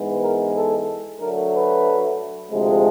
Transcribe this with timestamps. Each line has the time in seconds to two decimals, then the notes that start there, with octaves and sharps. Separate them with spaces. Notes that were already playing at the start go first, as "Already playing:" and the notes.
Already playing: G#2 E3 G#3 B3
0.21 A#4
0.55 A4
1.19 D2 D3 F#3 A3 A#4
1.53 B4
2.50 D2 C3 F3 G#3